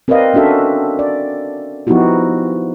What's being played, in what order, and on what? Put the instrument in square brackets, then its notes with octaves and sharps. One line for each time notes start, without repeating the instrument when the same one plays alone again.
[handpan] C4 A#4 B4 D5 D#5 F5
C#4 D4 F#4 A4 E5
D5
F3 B3 D#4 E4 F#4 G4